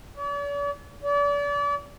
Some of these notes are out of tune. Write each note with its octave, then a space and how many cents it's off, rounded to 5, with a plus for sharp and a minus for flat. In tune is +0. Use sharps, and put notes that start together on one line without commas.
D5 -45
D5 -35